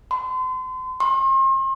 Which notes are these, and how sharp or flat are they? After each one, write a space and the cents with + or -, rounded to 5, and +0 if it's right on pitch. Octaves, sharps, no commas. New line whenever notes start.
C6 -35
C6 +40